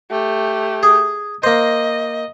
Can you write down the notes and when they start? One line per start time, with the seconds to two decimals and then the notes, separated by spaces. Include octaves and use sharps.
0.11 A3 G4
0.83 G#4
1.43 A#3 C5 D#5